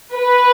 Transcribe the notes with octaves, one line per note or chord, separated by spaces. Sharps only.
B4